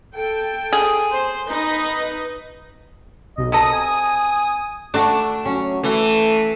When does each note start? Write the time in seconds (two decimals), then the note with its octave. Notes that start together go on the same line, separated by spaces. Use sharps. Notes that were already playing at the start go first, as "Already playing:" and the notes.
0.15 A4 G5
0.73 G#4
1.11 C5
1.47 D#4 B4 D#5
3.37 B1 D#5
3.52 C3 A4 A#5 D#6
3.73 G#5
4.94 A3 D4 F#4
5.45 F#3 C#4
5.83 E3 A3